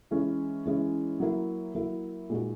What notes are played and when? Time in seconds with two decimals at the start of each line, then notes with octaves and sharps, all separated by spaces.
0.11 E3 G#3 C#4 E4
0.65 E3 G#3 C#4 E4
1.20 F#3 A#3 E4
1.75 F#3 A#3 E4
2.30 A#2 G#3 D#4 F#4